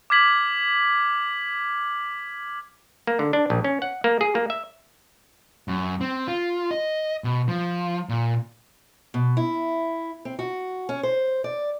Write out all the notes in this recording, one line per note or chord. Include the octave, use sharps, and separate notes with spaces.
D6 F6 G#6 B6 F#7
A#3
D3
D4
A#1
C#4
F#5
A#3
G#4
A#3
E5
F#2
C4
F4
D#5
B2
F3
A#2
B2
E4
C4
F#4
C#4
C5
D5